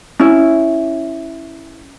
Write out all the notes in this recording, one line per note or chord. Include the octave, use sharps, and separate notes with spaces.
C#4 E4